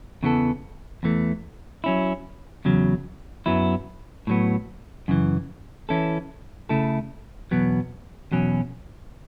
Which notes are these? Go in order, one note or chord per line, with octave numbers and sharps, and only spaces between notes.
E2 C#3 E3 B3 A4
E2 E3 A3
F#3 C#4 E4
E2 C#3 F#3
F#2 F#3 B3 E4
A2 F#3 B3
F#2 C#3 E3
E3 C#4 E4 A4
C#3 A3 E4 A4
E2 B2 F#3 B3
E2 B2 F#3 C#4